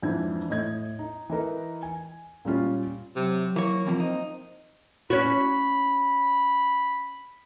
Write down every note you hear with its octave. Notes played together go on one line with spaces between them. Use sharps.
F2 G#2 E3 D4 G#6
A2 D#5 G#6
D#4
E3 D#4 A#4 B4
G#5
A#2 G3 C#4 F4
C3 F#3
E3 A#3 C#5
F2 C3 F3
C4 D#4
C#4 F#4 B5